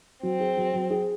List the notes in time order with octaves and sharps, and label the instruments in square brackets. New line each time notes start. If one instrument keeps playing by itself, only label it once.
[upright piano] F#3 [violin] C4
[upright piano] G#4
F#3
F#3
G#4